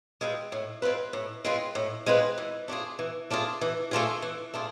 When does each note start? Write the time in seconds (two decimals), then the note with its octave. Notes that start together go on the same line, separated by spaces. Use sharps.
0.21 G#3 C4 F4 B4
0.52 A2
0.82 G#3 C4 F4 B4
1.13 A2
1.45 G#3 C4 F4 B4
1.75 A2
2.06 G#3 C4 F4 B4
2.38 E3
2.68 A3 D4 F4 G#4
2.99 E3
3.31 A3 D4 F4 G#4
3.61 E3
3.91 A3 D4 F4 G#4
4.22 E3
4.54 A3 D4 F4 G#4